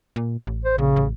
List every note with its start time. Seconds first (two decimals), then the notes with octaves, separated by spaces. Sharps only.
0.16 A#2
0.47 A1
0.65 C5
0.78 A#1 C#3
0.96 A1